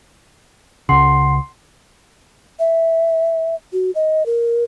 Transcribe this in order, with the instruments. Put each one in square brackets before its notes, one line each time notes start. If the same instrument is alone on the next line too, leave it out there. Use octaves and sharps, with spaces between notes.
[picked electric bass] C#2 C#3 [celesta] F#5 C6 C7
[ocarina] E5
F#4
D#5
A#4